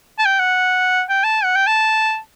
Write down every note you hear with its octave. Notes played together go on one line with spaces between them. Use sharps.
A5
G5
F#5
G5
A5
F#5
G5
A5